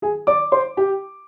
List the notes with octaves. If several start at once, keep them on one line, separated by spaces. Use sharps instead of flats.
G#4 G#5
D5 D6
C5 C6
G4 G5